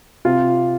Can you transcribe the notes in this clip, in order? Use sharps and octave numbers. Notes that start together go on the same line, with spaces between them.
C3 F4